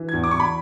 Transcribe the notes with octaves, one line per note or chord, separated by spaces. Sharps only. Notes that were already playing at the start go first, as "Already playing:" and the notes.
Already playing: E3
E2 G#6
D6
E2 C#6
B5